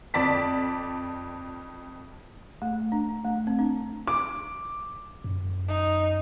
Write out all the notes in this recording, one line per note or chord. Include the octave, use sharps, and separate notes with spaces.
F2 D5 A5 B6
A3
D4
A3
C4
D4
D6
F#2
D#4